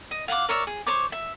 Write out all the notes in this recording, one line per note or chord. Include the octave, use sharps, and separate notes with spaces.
D#5
F5 F#5 G#5 D6
A#4 C#5 D5 E5
G#4
C5 C#5 D6
E5